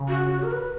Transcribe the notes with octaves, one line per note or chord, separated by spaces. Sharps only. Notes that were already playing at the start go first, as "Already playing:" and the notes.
Already playing: C#3
F#4
F#4
A#4
B4